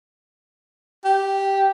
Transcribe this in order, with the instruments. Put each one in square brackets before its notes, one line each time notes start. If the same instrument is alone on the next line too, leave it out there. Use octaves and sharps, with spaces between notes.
[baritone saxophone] G4